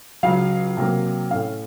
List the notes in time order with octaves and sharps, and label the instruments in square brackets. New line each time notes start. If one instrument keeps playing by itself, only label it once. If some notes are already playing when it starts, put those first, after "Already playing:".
[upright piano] C#2 C#3 F#3 F5
C3 F#3 A#3
A2 A3 C#4 F5